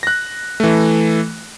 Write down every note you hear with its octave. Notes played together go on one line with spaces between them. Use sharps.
F#6 A#6
E3 A3